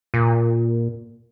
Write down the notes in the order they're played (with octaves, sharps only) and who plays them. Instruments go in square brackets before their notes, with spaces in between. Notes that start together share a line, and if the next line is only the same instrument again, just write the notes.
[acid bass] A#2